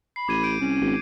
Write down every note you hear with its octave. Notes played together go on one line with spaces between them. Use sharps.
B5 C7
A1 D6 G#6 D#7
G6 D7
C2 C#4
G#1